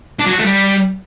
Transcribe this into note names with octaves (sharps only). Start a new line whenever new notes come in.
D4
F#3
F#4
A3
G3